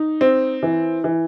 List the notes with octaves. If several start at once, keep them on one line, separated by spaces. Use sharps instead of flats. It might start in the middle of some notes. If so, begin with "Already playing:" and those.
Already playing: D#4
C4
E3
E3